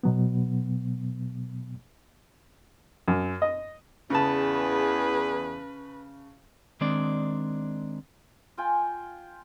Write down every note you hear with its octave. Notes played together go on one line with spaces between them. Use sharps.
B2 F#3 B3
F#2
D#5
E2 C#3 G#4 B4 A5
D#3 G#3 C4 D4 D5
F4 G5 G#5